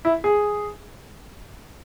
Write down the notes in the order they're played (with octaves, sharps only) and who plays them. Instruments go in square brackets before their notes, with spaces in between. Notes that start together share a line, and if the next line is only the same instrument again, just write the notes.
[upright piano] E4
G#4